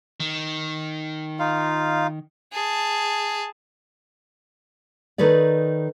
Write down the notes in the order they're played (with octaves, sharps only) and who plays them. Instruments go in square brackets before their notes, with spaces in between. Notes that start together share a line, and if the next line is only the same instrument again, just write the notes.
[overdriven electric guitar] D#3
[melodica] D#4 F4 F5
[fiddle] G#4 A5
[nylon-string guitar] D#3 D#4 A4 B4 C#5 D5